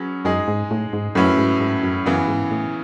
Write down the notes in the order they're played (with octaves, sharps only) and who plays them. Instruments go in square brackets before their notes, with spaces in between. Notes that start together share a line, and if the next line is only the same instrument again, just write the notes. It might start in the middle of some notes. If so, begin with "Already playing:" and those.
Already playing: [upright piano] F#3 C#4 G#4 B4
[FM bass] F#2 [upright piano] G#3 D#4 G#4
[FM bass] G#2
A2
G#2
[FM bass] F#2 [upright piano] A2 F#3 C#4 E4 B4
[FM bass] G#2
G#2
F#2
[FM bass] F#2 [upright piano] C#3 E3 B3
[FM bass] G#2
A2